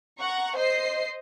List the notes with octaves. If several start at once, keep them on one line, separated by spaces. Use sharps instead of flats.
F#5 A#5 C#6
C5 D#5 C7